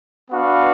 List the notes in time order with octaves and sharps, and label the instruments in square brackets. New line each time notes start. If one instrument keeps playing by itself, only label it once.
[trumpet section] B3 D4 F#4 B4 F5